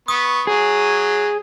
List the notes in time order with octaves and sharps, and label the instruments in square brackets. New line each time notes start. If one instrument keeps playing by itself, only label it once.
[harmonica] B3 C#6 [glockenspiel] D#6
[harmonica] F#3 [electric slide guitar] G#4